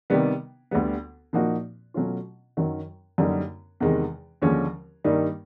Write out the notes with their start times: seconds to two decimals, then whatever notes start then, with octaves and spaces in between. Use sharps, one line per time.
0.10 C3 D#3 G3 B3
0.71 D2 D3 G3 B3
1.33 A#2 F3 A#3 D#4 F#4
1.94 B2 F#3 A3 C#4 F4
2.57 F#2 D#3 F#3
3.18 F#2 D3 G3 A#3 D#4
3.80 E2 C3 D#3 G#3
4.42 D#2 D3 F3 G#3 C#4
5.04 G2 D#3 G3 A#3 D#4